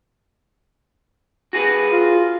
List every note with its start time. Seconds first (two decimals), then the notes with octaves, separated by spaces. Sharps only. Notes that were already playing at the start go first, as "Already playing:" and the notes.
1.53 F#4 G#4 B4
1.92 F4